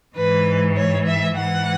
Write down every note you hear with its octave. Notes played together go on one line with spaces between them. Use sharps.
G#2 E3 B4
C#5
E5
G#2 E3 F#5